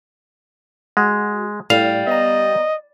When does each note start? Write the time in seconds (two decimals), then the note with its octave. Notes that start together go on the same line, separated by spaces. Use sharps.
0.97 G#3 F#4
1.70 A2 G3 F5
2.07 B3 D#5 A#5